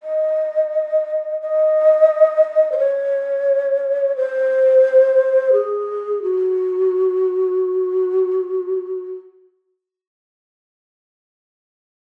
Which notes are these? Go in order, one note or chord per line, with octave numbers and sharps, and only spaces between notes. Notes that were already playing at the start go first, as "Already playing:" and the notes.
D#5
D#5
C5
C#5
C5
G#4
F#4